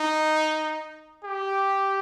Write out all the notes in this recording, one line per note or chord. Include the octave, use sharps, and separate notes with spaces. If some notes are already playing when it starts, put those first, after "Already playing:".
Already playing: D#4
G4